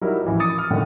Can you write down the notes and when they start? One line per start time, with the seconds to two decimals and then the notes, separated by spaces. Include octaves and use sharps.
0.01 F#3 G3 D#4 E4 A#4
0.25 A1 E3 F3
0.39 D6 D#6 A6 C#7 D#7
0.58 F6
0.70 F#2 A2 D3 D#3